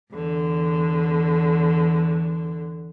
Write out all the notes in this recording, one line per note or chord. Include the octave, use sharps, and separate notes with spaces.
E2 D3